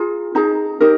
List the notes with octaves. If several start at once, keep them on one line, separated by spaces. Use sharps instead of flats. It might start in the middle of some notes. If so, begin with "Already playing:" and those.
Already playing: F4 G#4 A#5
D#4 G#4 A#5
D#4 G4 A#4